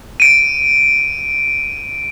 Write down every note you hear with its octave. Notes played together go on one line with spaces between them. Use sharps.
D7 D#7